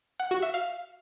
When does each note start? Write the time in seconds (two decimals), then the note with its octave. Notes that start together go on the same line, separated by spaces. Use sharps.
0.20 F#5
0.31 F#4
0.42 E5
0.54 F5